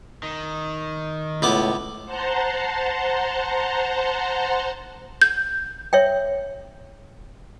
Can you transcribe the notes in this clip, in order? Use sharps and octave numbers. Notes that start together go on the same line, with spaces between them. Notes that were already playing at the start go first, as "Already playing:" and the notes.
D#3
C#2 A2 B3 D6
C5 F#5 A5 A#5 C6
G6
C#5 E5 G5